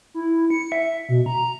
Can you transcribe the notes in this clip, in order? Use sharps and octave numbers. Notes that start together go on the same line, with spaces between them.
E4
C#7
E5
B2
A#5